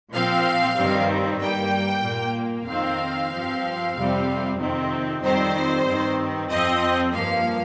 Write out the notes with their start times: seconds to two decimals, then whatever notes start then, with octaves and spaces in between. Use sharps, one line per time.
0.13 A#2 F3 C4 F5
0.76 G2 D#3 G3 C4
1.40 G2 G3 A#3 G5
2.04 A#2 A#3
2.68 F2 D#3 C4 F5
3.32 G2 F3 C4
3.96 F2 C3 G3 C4
4.60 F2 C3 D#3 C4
5.23 F2 D#3 G3 C4 C5
5.86 G2 D#3 C4
6.51 F2 F3 C4 D#5
7.14 G2 F3 A#3 F5